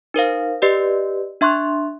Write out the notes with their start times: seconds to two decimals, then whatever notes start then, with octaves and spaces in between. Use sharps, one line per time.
0.14 D#4 A#4 C5 F5
0.62 G4 B4 D5 D#5
1.41 D4 E5 C6 C#6 F#6